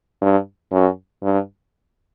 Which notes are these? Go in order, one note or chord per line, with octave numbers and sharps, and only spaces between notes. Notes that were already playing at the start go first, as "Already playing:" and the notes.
G2
F#2
G2